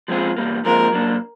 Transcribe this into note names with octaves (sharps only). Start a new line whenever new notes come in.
F3 G#3 C4 F4 G#4
E2 B2 G3 A#3
A#2 F3 G#3 C4 F4 A#4
F#3 A#3 D4